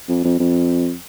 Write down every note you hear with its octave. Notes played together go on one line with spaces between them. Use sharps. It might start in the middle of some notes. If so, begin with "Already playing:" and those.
F2
F2
F2